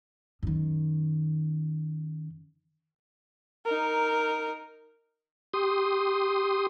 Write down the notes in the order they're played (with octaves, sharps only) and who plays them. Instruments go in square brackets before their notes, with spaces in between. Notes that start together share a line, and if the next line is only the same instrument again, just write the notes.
[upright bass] F#2 D#3
[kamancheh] D#4 A#4
[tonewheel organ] G4 C6 D#6